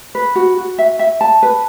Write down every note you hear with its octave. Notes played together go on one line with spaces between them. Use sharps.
B4
F#4
F#4
E5
E5
A5
B4